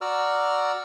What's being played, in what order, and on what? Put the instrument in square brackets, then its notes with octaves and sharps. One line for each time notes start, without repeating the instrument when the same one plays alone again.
[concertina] F#4 D5 A#5 E6 F6